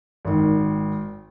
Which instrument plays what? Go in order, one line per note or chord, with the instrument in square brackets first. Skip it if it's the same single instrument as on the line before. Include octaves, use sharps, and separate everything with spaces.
[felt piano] G#1 D#3